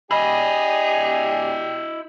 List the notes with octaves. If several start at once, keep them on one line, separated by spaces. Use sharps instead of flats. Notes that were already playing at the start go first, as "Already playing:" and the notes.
D4 E4 G4 G#4 D#5 B5